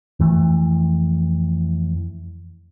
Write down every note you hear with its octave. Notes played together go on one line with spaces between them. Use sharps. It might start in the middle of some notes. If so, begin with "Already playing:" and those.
F2 E3 A3